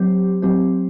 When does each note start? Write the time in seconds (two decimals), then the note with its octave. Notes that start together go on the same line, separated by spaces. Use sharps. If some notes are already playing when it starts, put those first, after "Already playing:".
Already playing: F#3 C4 G4 C5
0.42 F#3 C4 G4 C5